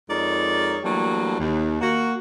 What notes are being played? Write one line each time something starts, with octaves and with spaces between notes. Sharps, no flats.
F2 G#3 D#4 A#4 C#5 D5
E3 F#3 G3 A3 A#3 D4
D#2
A#3 F#4